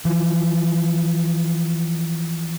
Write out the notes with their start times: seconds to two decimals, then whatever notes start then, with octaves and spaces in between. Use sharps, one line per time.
0.05 E3 F3